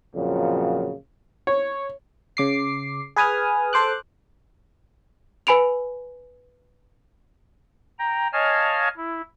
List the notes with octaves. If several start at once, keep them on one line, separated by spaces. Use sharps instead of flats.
F2 A#2 C#3 F#3
C#5
C#3 D6 C7
G#4 B4 G#5 D#6 F6
A4 C5 D6 F#6
B4 G#5 B5 D7 F7
G5 A#5
C#5 D#5 F5 G#5 A5 F6
E4